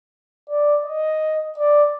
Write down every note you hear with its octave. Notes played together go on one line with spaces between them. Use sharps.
D5
D#5
D5